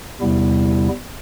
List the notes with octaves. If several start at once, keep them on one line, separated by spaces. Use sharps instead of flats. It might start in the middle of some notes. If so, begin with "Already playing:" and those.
E2 C3 G3 B3 E4